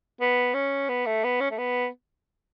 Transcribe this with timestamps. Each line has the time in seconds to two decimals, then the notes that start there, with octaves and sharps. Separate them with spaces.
0.21 B3
0.54 C#4
0.89 B3
1.06 A3
1.24 B3
1.41 C#4
1.51 A3
1.59 B3